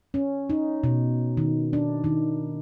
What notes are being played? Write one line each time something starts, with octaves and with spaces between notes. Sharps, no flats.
C#4
D#4
B2
D#3
D4
D#3